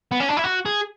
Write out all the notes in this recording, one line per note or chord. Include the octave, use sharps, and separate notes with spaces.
B3
C#4
D4
E4
F#4
G#4